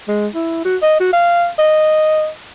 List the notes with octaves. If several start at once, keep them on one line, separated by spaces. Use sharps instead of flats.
G#3
E4
F#4
D#5
F#4
F5
D#5